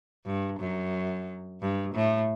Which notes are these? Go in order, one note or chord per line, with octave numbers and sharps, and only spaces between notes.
G2
F#2
G2
A2